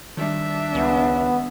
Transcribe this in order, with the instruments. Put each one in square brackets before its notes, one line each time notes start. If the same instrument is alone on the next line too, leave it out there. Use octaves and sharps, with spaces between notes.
[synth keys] D#3 G3 [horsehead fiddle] D4 E5
[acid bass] C#2 [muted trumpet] B3